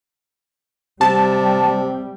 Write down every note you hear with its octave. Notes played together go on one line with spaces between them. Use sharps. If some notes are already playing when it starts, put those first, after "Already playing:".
C3 G3 A5